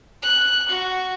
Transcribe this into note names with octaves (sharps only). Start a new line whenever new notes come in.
F#6
F#4